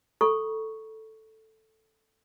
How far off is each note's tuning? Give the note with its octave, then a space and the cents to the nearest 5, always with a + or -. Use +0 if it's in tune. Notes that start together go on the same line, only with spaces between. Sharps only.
A4 +0 A#5 +45 C#6 +0